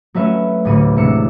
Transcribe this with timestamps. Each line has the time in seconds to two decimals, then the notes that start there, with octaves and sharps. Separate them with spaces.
0.14 F#3 A3 C#4 B4 E5
0.65 A1 D2 B5 C#6 D#7
0.96 E1 C3 D4 E6 C#7